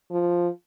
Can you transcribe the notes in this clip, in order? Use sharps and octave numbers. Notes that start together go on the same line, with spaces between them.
F3